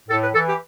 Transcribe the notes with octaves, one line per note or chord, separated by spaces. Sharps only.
A2 A4
B4
E3 A4
G4